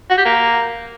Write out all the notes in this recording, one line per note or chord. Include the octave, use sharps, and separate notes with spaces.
F#4
G4
A#3